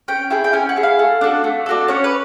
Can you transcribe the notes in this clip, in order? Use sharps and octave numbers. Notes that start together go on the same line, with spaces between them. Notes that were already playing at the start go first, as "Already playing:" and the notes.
C#4 G5
E4 G#4 G5
G5
C#4 G#5
F#5
E4 G#4
F5
A3
D4 F#4 A4
A3
D4 F#4 A4
C#4 C#5
B4